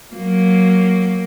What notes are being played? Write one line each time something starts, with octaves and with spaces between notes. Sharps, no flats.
F#3 A#3